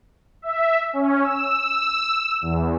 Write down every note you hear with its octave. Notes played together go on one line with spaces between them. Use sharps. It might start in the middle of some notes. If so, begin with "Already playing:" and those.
E5
C#4
E6
E2